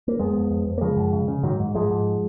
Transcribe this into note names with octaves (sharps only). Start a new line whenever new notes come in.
A#3
F2 G#3 B3
F2
F2
F2
A#3
C#3 F3 G#3
F#2
C#3
C#3
G#2 D#3 F#3
G#2
G#2 F3 G#3
G#2